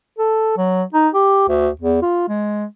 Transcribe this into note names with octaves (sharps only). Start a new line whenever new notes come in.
A4
F#3
D#4
G4
D2
E2
F4
G#3